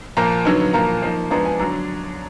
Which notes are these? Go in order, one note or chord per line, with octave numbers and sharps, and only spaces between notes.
A#2 F3 A#3 A#5
D3 F#3 B3 D#4
A#2 F3 A#3 A#5
F3 A#3 D#4
F3 G#3 B3 D4 A#5
G#5
D3 F#3 D4 A#5